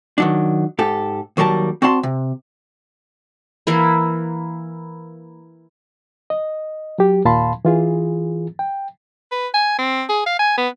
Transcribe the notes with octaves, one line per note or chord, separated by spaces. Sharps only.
D#3 F#3 D4
G#2 G4 A4
D#2 F#3 G3 A#4 A5
C4 F#4 D5 A5 C6
C3
E3 A#3 E4
D#5
F#3 G4
D#2 A#2 F5 A5 B5 C6
E3 F4 G#4
G5
B4
G#5
C4
G#4
F5
G#5
B3